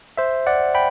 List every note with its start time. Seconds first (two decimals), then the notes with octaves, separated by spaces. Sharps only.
0.17 C5 E5
0.47 D5 F#5
0.75 G5 B5